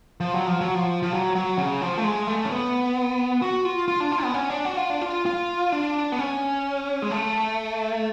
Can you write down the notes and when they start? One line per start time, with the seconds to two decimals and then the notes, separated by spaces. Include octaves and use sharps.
0.20 F3
0.34 F#3
0.47 F3
0.61 F#3
0.74 F3
1.03 F3
1.13 F#3
1.35 F#3
1.58 C#3
1.82 F3
1.98 A3
2.04 G#3
2.27 A3
2.45 C#4
2.50 B3
3.42 F#4
3.65 F4
3.88 F4
4.00 D4
4.12 F4
4.23 B3
4.34 C#4
4.50 D4
4.65 F#4
4.77 F4
4.90 D4
5.02 F4
5.26 F4
5.72 D4
6.12 B3
6.19 C#4
7.02 G#3
7.11 A3